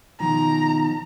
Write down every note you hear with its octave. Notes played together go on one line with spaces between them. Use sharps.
B2 D#3 F3 A#5